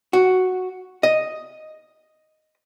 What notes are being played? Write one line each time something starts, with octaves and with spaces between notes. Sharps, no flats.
F#4
D#5